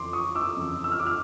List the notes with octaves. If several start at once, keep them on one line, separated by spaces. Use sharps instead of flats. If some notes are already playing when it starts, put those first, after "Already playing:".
Already playing: F2 C#3 E3 C6 D6
C#6 D#6
D6 E6
F2 C#3 E3
E6
F6
D6 E6
F6